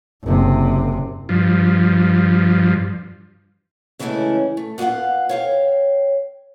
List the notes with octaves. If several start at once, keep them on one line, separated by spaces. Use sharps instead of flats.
F#1 C3
G2 F3
C#3 E3 G#3 A3 C#4 E4
A3
B3 F4 D5 F5 F#5
C#5 F5 G5